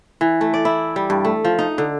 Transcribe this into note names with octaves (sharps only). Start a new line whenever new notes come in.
E3
A3
D5
E4
G3
G2
A3
F3
D#4
D3